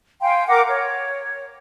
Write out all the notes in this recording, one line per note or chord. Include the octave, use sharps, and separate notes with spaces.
F5 G5 G#5 C6
A#4 F#5 D6
C#5